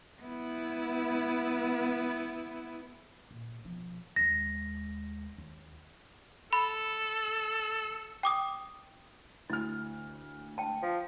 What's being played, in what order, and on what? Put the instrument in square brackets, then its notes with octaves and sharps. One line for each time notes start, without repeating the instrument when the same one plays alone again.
[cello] B3 E4
[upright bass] A#2
B2 F3
[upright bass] D#2 G#3 [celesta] A#6
[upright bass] D#2
[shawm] A4 [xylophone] B5
[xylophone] G5 D6 D#6
[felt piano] D2 F6 [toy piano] E4
[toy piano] G5 A5
[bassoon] F3